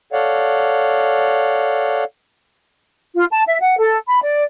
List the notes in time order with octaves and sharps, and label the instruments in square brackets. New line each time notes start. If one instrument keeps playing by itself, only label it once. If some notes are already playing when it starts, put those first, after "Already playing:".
[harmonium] A4 C#5 D5 F5 F#5
[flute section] F4
A5
E5
F#5
A4
B5
D5